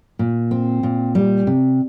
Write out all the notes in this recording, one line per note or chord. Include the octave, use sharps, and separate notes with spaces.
A#2
C4
A#2
G3
C3